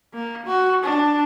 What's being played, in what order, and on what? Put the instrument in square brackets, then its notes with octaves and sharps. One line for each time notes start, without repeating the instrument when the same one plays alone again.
[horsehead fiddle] A#3
F#4
D4